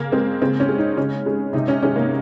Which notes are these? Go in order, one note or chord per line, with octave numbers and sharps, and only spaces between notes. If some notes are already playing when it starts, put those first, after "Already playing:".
Already playing: C#3 A#3
G#3 C4
C#3 C4
C#4
G#3
D#4
C#3 C#4
G#3
C3 D#4
C#4
D#3 G#3 C#4
A#3